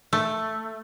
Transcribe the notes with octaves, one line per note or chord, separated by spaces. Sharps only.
A3